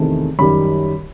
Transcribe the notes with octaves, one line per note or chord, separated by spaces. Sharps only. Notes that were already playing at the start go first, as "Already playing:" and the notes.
Already playing: E2 C3 D#3 A3
F#2 D#3 G3 B5